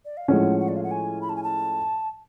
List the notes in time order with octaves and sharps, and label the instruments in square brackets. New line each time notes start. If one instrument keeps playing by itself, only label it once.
[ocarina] D5
F5
[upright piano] A2 F3 G#3 C#4 [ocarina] F#5
[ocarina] F#5
D5
F5
F#5
G#5
B5
A5
G#5
A5